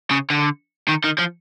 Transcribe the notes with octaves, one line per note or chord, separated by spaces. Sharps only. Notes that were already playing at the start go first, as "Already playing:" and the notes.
C#3
D3
D#3
D#3
F3